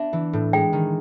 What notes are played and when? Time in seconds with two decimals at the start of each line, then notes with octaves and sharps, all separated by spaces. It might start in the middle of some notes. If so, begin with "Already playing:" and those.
Already playing: B3 D4 E5
0.13 E3
0.33 A2
0.53 G#3 G5
0.73 D#3